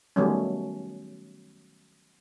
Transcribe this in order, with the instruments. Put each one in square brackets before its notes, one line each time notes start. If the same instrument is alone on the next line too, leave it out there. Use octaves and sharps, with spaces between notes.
[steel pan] D#3 F#3 G3 A3 B3 C#4